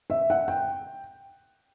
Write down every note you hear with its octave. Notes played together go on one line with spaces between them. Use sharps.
E5
F#5
G5